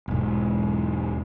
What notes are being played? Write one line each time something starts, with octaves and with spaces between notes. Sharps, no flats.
E1 G#2